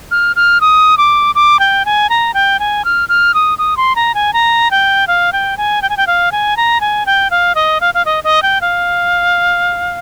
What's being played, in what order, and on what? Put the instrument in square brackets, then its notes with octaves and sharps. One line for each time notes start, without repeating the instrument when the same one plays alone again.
[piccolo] F6
F6
D#6
D6
D6
G5
G#5
A#5
G5
G#5
F6
F6
D#6
D#6
C6
A#5
G#5
A#5
G5
F5
G5
G#5
G5
G#5
G5
F5
G#5
A#5
G#5
G5
F5
D#5
F5
F5
D#5
D#5
G5
F5